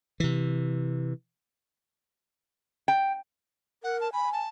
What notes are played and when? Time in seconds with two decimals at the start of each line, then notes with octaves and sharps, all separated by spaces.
0.20 C3 E3
2.88 G5
3.83 A#4 F#5
4.00 A5
4.13 G#5 B5
4.33 A5